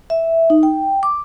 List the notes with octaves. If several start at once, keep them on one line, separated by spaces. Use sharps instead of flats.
E5
D#4
G5
D6